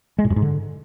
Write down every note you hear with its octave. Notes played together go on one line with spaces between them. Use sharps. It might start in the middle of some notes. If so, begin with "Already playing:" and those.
G#3
A2
F#2
G#2
D3